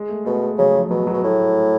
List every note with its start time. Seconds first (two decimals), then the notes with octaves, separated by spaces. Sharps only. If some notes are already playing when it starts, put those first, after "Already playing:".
Already playing: G#3
0.09 A3
0.25 B2 A3
0.42 G#3
0.58 C#3 F#3
0.74 F3
0.90 B2 F#3
1.07 F#3
1.14 B2
1.24 A2